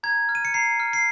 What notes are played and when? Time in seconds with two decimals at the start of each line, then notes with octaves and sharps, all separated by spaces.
0.03 A#5 G#6
0.29 F6
0.35 D#7
0.45 C#7
0.54 A#5 C7
0.80 F6
0.93 C7